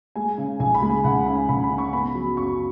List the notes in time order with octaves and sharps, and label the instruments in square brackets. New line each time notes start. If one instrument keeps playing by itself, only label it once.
[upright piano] G#3 G#5
C#3
C#2 G#5
B5
G#3
G#5
C#2 F#5
C#3 B5
C#2 B5
B5
C#3
C#6
B3 B5
F#3
F#2 C#6
B5